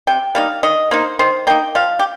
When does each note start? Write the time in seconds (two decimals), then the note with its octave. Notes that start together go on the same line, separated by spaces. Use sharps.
0.07 C3 G5
0.35 G3 A#3 D#4 F5
0.63 D#3 D#5
0.91 A#3 D#4 C5
1.19 D#3 C5
1.47 A#3 D#4 G5
1.75 F3 F5
1.99 G4